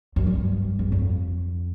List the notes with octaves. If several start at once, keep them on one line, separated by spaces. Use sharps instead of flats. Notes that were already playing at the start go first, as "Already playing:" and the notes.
F#2
G2
E2
F2